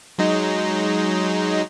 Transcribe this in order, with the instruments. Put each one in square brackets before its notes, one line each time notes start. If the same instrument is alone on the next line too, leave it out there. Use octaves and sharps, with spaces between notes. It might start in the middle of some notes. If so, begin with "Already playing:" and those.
[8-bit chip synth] F#3 G#3 D#4